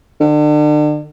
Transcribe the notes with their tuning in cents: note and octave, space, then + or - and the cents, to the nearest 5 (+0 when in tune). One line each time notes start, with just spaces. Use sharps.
D3 +35